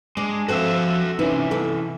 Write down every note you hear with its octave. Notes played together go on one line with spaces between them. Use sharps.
G#3 D4
F3 C4 D4 F#4 A4 E5 E6
C3 E3 B3 C#4 D#4
B3 E4 A4